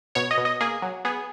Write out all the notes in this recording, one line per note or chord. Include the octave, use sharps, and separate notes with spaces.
B2 C#5
D#5
B2
D#5
A#3 G#4
F#3
B3 G#4